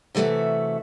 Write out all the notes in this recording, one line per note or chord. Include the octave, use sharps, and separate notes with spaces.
C3 E3 A3 F#4 E5